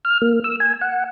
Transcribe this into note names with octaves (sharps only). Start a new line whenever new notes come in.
F6
A#3
E6
G#5
F#5